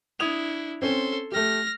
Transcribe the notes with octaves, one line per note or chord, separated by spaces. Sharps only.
D4 E4 D#6 G#6 F7
C4 C#4 A4 C6
A3 G4 F6 A#6